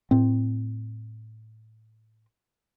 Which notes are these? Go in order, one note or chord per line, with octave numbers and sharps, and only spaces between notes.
A2 C4